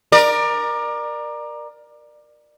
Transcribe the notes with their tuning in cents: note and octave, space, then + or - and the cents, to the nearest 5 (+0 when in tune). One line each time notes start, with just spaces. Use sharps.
A#4 +15 D5 +25